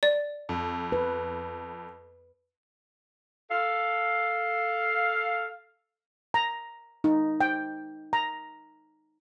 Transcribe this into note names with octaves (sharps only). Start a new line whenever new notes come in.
D5
F2
B4
A4 F5
A#5
D#4
G5
A#5